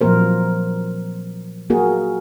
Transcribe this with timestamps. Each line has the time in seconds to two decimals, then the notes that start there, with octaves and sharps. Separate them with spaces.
0.01 A#2 F3 F#3 A#3 A#4 C5
1.70 A#3 F#4 G#4 A#4